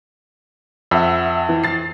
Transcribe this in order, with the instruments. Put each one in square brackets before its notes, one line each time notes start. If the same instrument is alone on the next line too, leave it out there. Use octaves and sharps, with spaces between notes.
[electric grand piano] F2 [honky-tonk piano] E5 F#5
[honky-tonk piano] E3
A6 C7